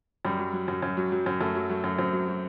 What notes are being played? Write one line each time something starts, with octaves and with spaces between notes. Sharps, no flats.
F#2 G3
F#3
F#3
F#2
F#2
F#3
F#3
F#2
F#2 A3
F#3
F#3 A3
F#2
F#2 C4
F#3
F#3